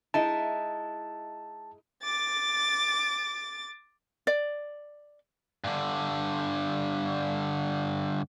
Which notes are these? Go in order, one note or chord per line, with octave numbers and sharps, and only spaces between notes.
G#3 D#4 E4 A5
D6 A6
D5
G2 D3